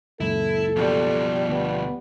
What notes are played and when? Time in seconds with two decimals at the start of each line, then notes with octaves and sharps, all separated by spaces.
0.20 C#2 F#2 A#2 E4 A4
0.76 B2 F3 G3
1.50 D2 B3